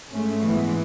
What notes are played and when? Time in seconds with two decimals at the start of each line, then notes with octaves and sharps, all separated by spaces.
0.10 G#2 G#3 A3 C#4
0.43 G#2 E3 G#3 B3